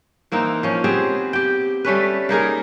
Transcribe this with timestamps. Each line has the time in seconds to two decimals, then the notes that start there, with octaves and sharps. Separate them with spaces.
0.32 E3 A#3 C4 D#4
0.63 F3 C#4
0.84 B3 C4 G4 G#4
1.33 G4 G5
1.85 G3 A3 C#4 B4
2.29 A#3 D#4 G#4 A#4